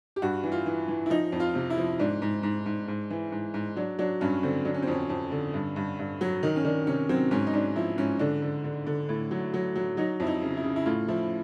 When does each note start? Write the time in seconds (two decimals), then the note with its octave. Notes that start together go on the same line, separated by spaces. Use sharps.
0.16 G4
0.22 G2 F#4
0.44 E3
0.52 F4
0.66 E3
0.88 E3
1.06 E4
1.10 F3 D#4
1.32 F2
1.40 F4
1.55 C3
1.70 E4
1.77 F3
1.99 G#2 D4
2.22 G#2
2.43 G#2
2.66 G#2
2.88 G#2
3.10 E3
3.32 G#2
3.54 G#2
3.76 F#3 D4
3.99 F#3 D4
4.21 G2 C#4
4.43 D3 C4
4.65 F#3 D4
4.74 C#4
4.82 C4
4.87 F2 C#4
5.10 F2
5.32 D3
5.54 G2
5.76 G2
5.99 G2
6.21 F#3
6.43 D#3 D#4
6.56 C#4
6.65 D#3 D4
6.87 C3 C#4
7.09 F#3 C4
7.31 G#2 C#4
7.47 D#4
7.53 G#2 D4
7.76 F3 E4
7.98 G#2 C#4
8.19 D3 D4
8.42 D3
8.64 D3
8.87 D3
9.09 A2
9.31 F#3
9.54 F#3
9.76 F#3
9.97 F#3 D#4
10.20 F2 E4
10.27 D#4
10.42 C#3
10.57 E4
10.63 C#3
10.76 E4
10.86 A2 F4
11.08 F3 E4